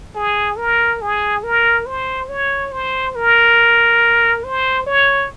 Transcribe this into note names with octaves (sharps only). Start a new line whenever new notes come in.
G#4
A#4
G#4
A#4
C5
C#5
C5
A#4
C5
C#5